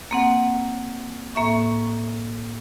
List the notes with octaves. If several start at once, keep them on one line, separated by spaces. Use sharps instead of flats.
A#3 C4 F#5
A2 A#3 E5 C#6